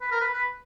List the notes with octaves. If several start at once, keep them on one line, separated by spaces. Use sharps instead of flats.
B4
A#4
B4
B4